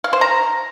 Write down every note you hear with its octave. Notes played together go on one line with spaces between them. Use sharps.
F5
C5
A#5